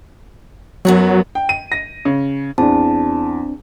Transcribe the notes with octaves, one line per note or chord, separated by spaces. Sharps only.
F#2 F#3 B3 F#4
G5
D#7
A#6
C#3
E2 C4 D4 A5